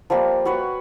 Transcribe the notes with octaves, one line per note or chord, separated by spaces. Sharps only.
F3 G3 A#3 F4
F#4 B4 C#5 F#5